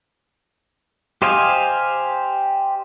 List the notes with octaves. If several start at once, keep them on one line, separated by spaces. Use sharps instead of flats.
G4 C5 D#5 F5 G#5